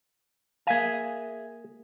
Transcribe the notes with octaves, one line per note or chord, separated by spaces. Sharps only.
A#3 G#4 E5 F5 G#5